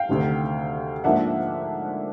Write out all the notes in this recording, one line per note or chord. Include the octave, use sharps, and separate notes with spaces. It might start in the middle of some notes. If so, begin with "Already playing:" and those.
Already playing: F5 G5
D2 C3 D#3
G#2 F3 A#3 D4 E5 F#5